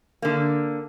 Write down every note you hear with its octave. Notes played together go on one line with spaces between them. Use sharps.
D3 A#3